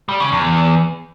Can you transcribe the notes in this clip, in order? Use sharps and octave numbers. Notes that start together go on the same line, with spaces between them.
G3
C#3
E2